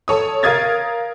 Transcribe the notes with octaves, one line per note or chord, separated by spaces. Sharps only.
A4 C#5 D#6
A#4 F5 D#6 G#6 A6